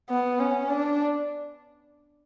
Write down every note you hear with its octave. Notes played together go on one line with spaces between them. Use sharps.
B3
C#4
D4